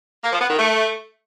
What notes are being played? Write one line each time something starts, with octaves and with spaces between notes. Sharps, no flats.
A#3
F3
B3
D#3
A3